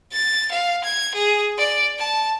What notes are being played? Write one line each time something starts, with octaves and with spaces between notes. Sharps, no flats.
A6
F5
G#6
G#4
D5
A5